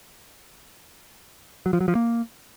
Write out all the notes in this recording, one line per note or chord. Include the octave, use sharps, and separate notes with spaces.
F#3
F3
F#3
F3
A#3